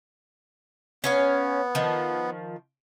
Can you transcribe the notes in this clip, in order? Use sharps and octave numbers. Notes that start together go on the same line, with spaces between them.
B3 C#4 C#5 F5
D#3 F3